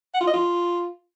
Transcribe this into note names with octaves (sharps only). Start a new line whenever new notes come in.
F#5
F4
D#5
F4